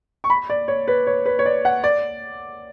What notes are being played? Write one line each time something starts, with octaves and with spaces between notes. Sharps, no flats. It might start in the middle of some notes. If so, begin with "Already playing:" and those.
C#6
B5
D5
C#5
B4
C#5
B4
C#5
D5
F#5
D5